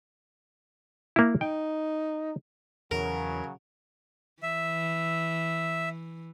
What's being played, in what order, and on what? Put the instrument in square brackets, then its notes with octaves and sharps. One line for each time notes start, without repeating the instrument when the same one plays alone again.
[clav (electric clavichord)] A#3 E4
[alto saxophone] D#4 [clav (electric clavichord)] G5
[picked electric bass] E2 [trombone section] C#3 F#3 [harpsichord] A#4
[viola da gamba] E3 [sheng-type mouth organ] E5